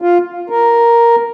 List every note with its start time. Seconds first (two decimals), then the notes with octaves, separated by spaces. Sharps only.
0.02 F4
0.50 A#4